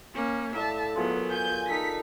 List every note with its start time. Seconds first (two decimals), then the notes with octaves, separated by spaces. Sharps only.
0.14 A#3 C#4
0.55 A2 D5 E5 F5 A5
0.96 F#3 B3 F4 G#4 A#4
1.31 G#5 G6
1.70 D#4 A4 A#4 B6